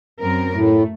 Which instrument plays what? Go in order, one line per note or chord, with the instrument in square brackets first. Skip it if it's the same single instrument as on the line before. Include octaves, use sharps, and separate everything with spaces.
[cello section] F#2 C4 A#4
[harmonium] A2 [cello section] A3